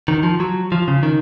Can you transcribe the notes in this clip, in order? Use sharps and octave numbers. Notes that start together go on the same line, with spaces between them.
D#3
F3
F#3
F3
C#3
D#3